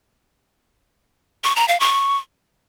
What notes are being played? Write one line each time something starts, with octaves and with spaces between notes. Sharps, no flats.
C#6
A#5
F5
C#6